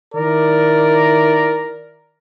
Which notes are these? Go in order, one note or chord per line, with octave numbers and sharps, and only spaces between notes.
D#3 E4 A#4 D5